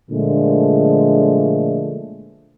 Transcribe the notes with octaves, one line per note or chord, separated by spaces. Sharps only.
A#2 D3 F3 G#3 A3